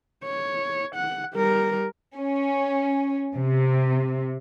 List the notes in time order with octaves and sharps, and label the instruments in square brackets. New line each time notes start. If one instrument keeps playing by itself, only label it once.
[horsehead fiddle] C#5
F#5
G3 A#4
[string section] C#4
C3